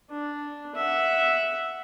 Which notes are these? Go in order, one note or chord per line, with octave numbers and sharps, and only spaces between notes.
D4
E5 F#5